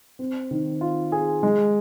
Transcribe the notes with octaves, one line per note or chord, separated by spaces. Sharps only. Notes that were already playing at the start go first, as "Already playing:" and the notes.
C4
D#3
F4
G#4
G#3